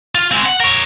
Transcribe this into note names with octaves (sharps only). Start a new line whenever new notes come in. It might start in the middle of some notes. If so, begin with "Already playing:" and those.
F4
G#3 C4
F#5
A#4 C#5